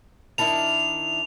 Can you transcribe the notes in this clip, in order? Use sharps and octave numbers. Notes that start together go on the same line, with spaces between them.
D#3 D4 E4 F7